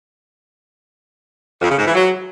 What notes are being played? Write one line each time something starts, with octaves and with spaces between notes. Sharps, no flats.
F2
C#3
G#2
E3
F#3